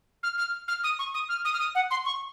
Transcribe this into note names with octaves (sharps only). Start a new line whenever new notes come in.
F6
F6
F6
D#6
C#6
D#6
F6
D#6
F6
D#6
F#5
C6
C#6